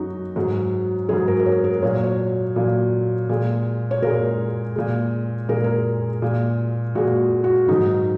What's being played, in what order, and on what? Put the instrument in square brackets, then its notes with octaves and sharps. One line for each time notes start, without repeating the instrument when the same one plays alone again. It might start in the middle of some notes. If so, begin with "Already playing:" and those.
Already playing: [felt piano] F#2 F#3 D#4 F#4
G#2 F#3
G#2 F#3 G#4
A#4
A#4
C#5
A#4
A#2 F#3 C#5
C#5
A#2 F#3
A#2 G#3
C#5
A#2 G#3 A#4
A#2 G#3
A#2 G#3 A#4
G#4
A#4
A#2 G#3
A#2 G#3 F#4
F#4
G#2 D#3 F#3 D#4